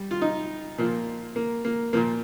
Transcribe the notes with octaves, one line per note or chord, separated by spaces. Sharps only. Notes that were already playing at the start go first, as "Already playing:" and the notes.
Already playing: G3
F4
D#4
A#2 F3 A#3
A#3
A#3
A#2 F3 A#3